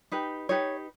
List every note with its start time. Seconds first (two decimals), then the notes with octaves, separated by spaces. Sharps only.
0.12 D#4 G4 B4
0.49 D#4 G4 B4 C#5